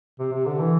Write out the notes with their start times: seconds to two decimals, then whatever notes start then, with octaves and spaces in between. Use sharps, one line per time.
0.19 C3
0.33 C3
0.46 D3
0.59 E3